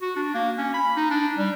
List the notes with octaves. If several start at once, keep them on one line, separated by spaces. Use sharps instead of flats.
F#4
D4
A#3
C#4
B5
D#4
D4
G3